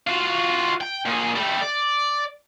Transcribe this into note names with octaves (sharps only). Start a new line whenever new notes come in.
F4 F#4
G5
A#2 G#4
G3 A3
D5